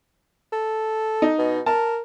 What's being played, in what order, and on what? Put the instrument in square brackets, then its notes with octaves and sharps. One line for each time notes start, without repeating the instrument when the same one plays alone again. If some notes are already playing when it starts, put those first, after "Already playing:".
[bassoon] A4
[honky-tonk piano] D#4
[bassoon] B2
[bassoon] A#4 [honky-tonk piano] A5